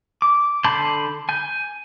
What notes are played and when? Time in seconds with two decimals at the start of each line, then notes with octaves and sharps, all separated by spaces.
0.22 D6
0.64 D3 A5 B5 C6 G6
1.29 G#5 G6